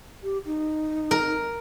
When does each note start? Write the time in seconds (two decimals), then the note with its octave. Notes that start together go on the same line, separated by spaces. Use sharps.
0.23 G4
0.46 D#4
1.11 A#4